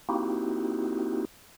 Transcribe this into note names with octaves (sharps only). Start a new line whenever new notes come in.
A#3 C4 D#4 E4 F#4 G4